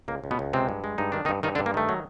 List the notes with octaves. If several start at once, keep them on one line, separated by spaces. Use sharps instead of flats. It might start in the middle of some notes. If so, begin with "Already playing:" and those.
C#2 A#3
C#2
B2 B3
C#2
C3 G#3 C4
G2
G#3
G2 D#4
D#3 D4
D#3 D#4
G2
G2 D#3 D#4
D3 D4
G2
A#3
D#3 A3
F#3